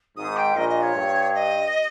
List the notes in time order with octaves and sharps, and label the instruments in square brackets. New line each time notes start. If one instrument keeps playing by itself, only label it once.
[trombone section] G#1 G#2 [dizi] D#6
[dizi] G5
[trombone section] A#1 A#2 [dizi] D#5
[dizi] D#5
C#5
[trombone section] G2
[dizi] D#5